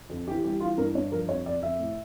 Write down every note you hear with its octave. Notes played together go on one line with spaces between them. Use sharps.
F2
E3 G4
G3 G4
E3 F4
G2 A#4
G2 C#5
F3 A#4
F2 C#5
F2 D5
F2 E5
A2